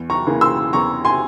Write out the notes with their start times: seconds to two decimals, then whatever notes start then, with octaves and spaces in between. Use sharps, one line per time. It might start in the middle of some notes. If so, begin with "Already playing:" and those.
Already playing: E2
0.10 A#5 C#6
0.27 C#3 E3 A#3
0.41 C6 E6
0.73 E2 A#5 C#6
1.05 G#5 C6